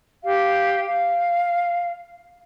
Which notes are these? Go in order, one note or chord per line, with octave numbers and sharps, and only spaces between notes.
G4 F5
F5